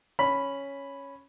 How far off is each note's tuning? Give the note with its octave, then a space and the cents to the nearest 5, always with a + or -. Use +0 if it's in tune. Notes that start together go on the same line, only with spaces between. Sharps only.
C#4 +0 B5 +0